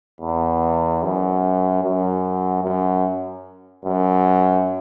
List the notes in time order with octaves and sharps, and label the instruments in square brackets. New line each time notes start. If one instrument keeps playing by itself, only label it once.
[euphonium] E2
F#2
F#2
F#2
F#2